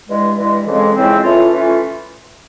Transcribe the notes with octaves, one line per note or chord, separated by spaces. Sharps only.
G2 E3 G#3
G2 E3 G#3
F2 C#3 E3 G#3 C4
F2 C#3 E3 G#3 C4
E3 A3 C#4 F4
E3 A3 C#4 F4